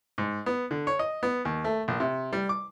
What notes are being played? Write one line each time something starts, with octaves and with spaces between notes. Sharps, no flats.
G#2
B3
D3
C#5
D#5
B3
D#2
A3
A#1
C3
G3
D6